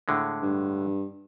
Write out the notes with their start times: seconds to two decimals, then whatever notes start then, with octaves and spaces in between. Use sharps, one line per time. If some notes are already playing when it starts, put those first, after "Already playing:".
0.08 A2 D3 G#3
0.42 G2